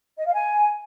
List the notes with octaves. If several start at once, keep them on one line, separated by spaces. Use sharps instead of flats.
D#5
F5
G#5